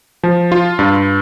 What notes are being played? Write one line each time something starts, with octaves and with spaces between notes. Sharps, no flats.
F3
F4
G2